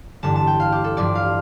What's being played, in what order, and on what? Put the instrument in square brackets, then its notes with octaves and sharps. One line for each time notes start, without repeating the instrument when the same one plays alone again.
[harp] A1 G2 D3 G3 A5
A5
G5
F5
G4
A4
A1 G2 F3 D5
F5